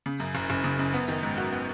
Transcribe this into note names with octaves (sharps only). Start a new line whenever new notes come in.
C#3
F#2
F#1
F#1
C#3
F#2
B3
D#3
G#2
F#4
B3